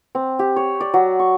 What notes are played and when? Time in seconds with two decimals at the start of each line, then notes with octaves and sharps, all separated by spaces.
0.15 C4
0.39 G4
0.56 C#5
0.80 D5
0.94 F#3
1.19 C#6